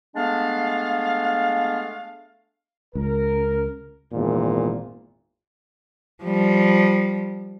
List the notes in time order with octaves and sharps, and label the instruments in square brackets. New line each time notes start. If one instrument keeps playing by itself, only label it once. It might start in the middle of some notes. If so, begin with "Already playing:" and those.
[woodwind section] G#3 A3 B3 D4 F5
[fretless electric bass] C#2 [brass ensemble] A#4
[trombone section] G#1 E2 A#2
[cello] F3 G3